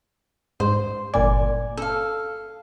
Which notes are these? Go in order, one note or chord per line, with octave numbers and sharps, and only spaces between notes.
G#2 C5
G1 A#2 D5 G#5
A4 F5